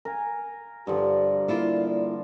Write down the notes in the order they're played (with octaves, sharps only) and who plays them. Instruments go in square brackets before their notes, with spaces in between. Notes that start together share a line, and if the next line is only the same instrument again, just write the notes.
[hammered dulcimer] A#4 F5 G#5
[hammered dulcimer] G2 D3 F3 [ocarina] G4
[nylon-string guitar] A#3 E4 F4 [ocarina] D5